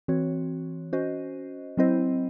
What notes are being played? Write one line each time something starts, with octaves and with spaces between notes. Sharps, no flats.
E3 C4 F#4 C#5
C#4 F#4 C5 D#5
F#3 C4 E4 C5 D#5